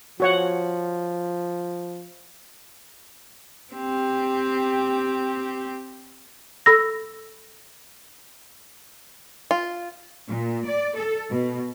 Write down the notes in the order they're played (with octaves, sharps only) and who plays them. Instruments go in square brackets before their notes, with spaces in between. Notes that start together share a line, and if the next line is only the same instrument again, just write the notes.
[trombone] F3 [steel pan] F#4 C#5 F#5
[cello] C4 G4
[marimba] A4 B5 E6 A#6
[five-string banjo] F4
[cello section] A#2
D5
A4
B2